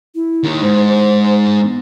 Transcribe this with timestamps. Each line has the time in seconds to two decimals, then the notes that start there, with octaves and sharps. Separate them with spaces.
0.15 E4
0.44 D#2 D#3
0.63 G#2 C5
0.89 C5
1.62 B3